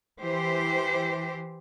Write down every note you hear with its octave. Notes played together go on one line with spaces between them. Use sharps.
E3 G4 C5